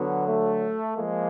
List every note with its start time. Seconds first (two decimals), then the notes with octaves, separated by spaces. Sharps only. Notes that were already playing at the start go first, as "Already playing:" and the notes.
Already playing: D3 F#3 B3
0.26 A3
0.97 F3 G#3 A#3